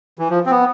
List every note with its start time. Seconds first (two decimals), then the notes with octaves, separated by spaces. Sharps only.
0.19 E3
0.30 F3
0.46 C4
0.51 B3